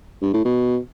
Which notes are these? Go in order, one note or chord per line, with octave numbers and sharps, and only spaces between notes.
G2
A2
B2